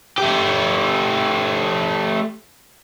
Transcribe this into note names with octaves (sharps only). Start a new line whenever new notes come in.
A3 G4